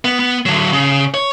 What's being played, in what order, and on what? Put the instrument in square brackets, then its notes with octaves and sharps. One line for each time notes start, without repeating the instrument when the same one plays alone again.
[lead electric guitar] B3
B3
D3 F#3
C#3
C#5